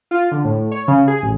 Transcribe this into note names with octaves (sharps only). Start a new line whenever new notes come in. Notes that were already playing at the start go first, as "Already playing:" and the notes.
F4
D3
A2
C#5
C#3
G#4
A1